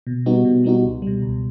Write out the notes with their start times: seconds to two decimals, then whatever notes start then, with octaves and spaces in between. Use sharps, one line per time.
0.07 B2
0.26 G3 B3 D#4 F#4
0.45 B2
0.64 G3 B3 D#4 F#4
0.83 C#2
1.02 B2 G3
1.22 C#2